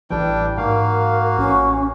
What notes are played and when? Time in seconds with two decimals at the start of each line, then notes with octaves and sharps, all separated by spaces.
0.11 A1 E3 G3 D4 G5
0.57 G#2 A#3 F#4 A#4 F5
1.38 A1 C#4